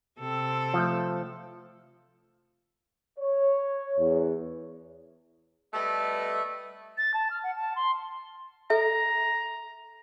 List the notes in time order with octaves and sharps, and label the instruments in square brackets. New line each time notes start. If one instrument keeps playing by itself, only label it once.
[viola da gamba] C3 C4 A4
[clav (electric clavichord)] F3 A3
[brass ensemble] C#5
E2
[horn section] G3 A3 B3 A4 D#5
[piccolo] A6
A5
F6
F#5
A5
C6
[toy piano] A4 E5 [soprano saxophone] A#5